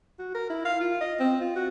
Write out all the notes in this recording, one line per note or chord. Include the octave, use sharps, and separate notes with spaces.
F#4
A#4
E4
F5
F4
D#5
C4
F4
F#4